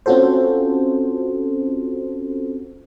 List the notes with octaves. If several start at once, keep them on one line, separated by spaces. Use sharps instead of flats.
C4 C#4 F4 F#4 A4 C5